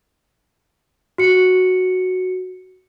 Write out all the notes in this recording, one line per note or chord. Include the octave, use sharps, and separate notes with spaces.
F#4 C#7